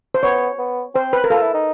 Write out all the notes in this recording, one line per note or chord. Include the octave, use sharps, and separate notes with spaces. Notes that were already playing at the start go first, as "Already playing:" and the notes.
C5
B3 C#5
B3
C4 C5
B4
A#4
F4 A4
E4
D#4